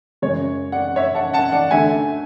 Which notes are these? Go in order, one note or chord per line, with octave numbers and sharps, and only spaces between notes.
F#2 C#3 G#3 C#5
D5 F#5
C#5 E5
F#5 A5
F#5 A5
D5 F#5
D2 D3 A3 E5 G#5